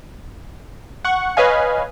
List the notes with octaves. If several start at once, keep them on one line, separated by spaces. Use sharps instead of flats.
F#5 C#6
B4 C#5 D#5 F5 G#5